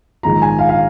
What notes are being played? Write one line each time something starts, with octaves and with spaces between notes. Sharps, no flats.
A#1 G#2 D#3 G#3 F4 A#5
G#5
F5
F5